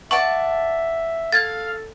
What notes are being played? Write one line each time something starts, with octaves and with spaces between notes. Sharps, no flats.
D5 E5 F#5 A5 C#6
A4 F5 G#6 A6